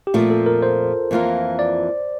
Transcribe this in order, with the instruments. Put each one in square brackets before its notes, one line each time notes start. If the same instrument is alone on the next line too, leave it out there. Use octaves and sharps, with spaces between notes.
[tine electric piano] G4
[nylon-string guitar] A#2 F3 A3 C4 [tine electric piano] F4
[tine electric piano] A4
A#4
C5
[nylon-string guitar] F2 E3 A#3 F4 A#4
[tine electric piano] D5